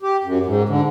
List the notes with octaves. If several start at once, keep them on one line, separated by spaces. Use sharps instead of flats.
G4
F#2
G#2
D3